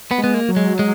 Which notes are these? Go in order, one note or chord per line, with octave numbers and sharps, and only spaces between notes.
B3
G#3
B3
A#3
F#3
G#3
G#3